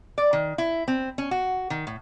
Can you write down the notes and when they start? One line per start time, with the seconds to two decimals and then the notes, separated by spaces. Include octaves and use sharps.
0.18 D5
0.33 D#3
0.58 E4
0.88 C4
1.18 C#4
1.31 F#4
1.70 D#3
1.87 A2